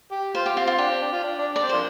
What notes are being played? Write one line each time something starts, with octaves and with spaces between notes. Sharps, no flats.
G4
F4 C5
G4
C4 F4
F4
D4 G4
C4
D4
F4
D4
D4
D4 D5
C4
F3 A#3 D4 C5